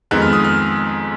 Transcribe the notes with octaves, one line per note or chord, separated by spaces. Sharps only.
F2 D#3 G#3 B3 F#6
F6
D#6
F6